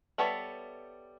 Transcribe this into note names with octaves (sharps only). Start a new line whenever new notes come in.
G3 B3 A4 C#5 E5